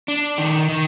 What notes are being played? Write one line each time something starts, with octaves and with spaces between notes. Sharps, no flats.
D4
D#3
D#3